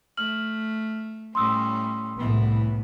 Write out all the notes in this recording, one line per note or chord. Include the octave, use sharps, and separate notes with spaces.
A3 F6 F#7
A2 G3 C#4 C6 D#6 E6
C2 A2 E3 B3